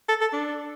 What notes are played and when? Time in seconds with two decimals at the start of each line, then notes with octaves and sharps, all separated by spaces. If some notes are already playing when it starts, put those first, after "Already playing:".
0.09 A4
0.21 A4
0.33 D4